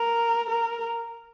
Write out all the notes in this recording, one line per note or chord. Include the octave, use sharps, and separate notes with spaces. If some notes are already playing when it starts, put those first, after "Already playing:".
Already playing: A#4
A#4